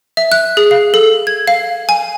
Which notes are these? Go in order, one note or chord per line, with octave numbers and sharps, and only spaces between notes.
E5
F#6
G#4
F5
A4
G#6
F5
G#5